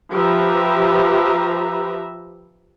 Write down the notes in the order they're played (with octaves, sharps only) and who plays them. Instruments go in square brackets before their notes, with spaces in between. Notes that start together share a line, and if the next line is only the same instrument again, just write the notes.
[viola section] F3 G4 B4 E5 A#5